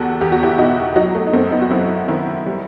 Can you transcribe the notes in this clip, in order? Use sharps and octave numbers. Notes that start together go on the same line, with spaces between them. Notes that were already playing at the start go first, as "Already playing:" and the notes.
Already playing: E2 F#4 G4 A4
E2 G4
F#4
E4 G4
B2 D#4 F#4
F#3 D#4 F#4
A3
D#4
F#2 A3 C4
B3 D#4
F#4
F#2 C4 E4
D#3 C4 E4
G3